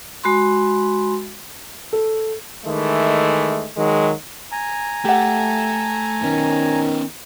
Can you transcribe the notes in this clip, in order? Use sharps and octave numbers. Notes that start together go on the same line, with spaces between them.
G#3 F#4 B5 C6
A4
D#3 E3 G#3 A3
D#3 F#3 G#3
G#5 A#5
A3 G4 F#5
D#3 B3 C#4